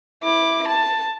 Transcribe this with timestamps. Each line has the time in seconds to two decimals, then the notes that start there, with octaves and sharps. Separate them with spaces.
0.23 E4 D6
0.67 A5